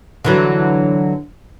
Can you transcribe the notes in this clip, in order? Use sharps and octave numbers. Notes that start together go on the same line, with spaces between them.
D3 E3 F#3